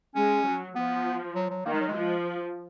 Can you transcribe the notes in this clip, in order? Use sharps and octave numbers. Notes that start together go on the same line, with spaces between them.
G#3 C#4
F#3
F3 B3
F#3
F#3
D#3 A#3
G#3
F#3
G#3
F3